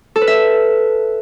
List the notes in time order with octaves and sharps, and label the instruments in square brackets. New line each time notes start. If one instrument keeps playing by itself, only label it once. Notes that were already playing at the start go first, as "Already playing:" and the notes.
[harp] A4
B4
E5